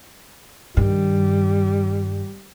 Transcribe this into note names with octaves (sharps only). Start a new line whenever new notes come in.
G2 D#3 G3